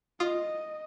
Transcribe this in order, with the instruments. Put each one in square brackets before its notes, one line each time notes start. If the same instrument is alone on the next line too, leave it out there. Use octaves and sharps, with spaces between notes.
[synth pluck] F4 [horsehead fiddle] D#5 [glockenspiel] D#6